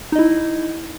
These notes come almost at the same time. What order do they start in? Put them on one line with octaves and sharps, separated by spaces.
D#4 D#5 E4